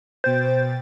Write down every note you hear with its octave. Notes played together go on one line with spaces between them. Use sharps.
B2 C5 G5 A6